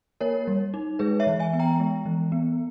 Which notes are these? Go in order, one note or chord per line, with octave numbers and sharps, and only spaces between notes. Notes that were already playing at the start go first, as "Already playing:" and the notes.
A#3 A#4 C#5
G3
D#4
G#3 G#4 B4
C#5 E5
E3
E5 G#5
B3
G5 A#5
G#3
E3
B3